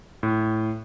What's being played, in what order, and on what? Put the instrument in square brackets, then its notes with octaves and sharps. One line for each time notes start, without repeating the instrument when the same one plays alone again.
[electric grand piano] A2